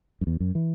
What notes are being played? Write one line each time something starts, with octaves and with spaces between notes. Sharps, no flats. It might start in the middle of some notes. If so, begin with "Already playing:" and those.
F#2
E2
F#2
E3